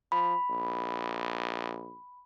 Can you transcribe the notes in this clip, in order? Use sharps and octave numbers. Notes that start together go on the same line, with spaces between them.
F3 B5
A#1